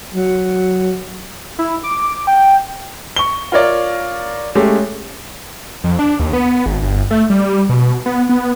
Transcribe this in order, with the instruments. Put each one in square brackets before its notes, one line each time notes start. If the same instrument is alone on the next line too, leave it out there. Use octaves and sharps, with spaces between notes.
[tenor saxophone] F#3
[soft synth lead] E4
D6
G5
[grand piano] C#6 G7
F4 A#4 C#5 D5
G#3 A3 C#4 G4
[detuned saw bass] F2
D4
D#2
B3
G#1
G1
A3
G3
B2
B3
B3